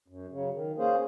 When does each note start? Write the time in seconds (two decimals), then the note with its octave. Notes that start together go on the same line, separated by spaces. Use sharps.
0.08 F#2
0.31 C#3 F#3
0.54 D#3
0.77 A#3 C#4 G#4 C5